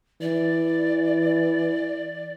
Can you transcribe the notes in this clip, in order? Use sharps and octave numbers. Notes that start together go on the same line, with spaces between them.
E3 D5